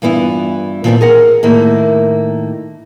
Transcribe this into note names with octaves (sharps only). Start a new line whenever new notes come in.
G2 E3 B3 E4 F4
A#2 D#3 F3 G3 B3 C4
G#4 A#4 F#5
A2 D#3 A#3 E4